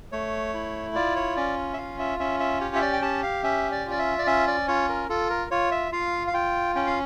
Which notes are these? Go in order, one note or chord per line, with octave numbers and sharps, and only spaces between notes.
A3 C#5
E4
F4 D5
C#5
C#4 D5
E5
F4 F5
E5
C#4 E5
E5
G4 C#5
E5
D5
G5
G4 A5
F5
C#4 E5
D5
F4
D5
E5
D5
C#4 E5
D5
F4 C#5
A#4
F4 A4
A#4
F4 C#5
E5
F4 F5
F5
F4 G5
C#4 G5
F5